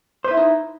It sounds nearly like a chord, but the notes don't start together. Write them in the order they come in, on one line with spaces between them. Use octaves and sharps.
C5 B4 E4 E5 D#4